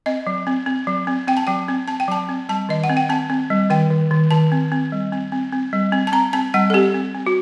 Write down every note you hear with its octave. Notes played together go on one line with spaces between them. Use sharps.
C4 D#5
F#3
C4
C4
F#3
C4
C4 G5
A5
F#3 G5
C4
C4 A5
G5
F#3 A5
C4
G3 A5
D#3 D#5
F#5
C4
G5
C4 A5
C4
G3
D#3 G5
D#3
D#3
D#3 A5
C4
C4
G3
C4
C4
C4
G3
C4
A5
C4 A#5
C4 A5
G3 F#5
A4
C4 G4
C4
C4
F#4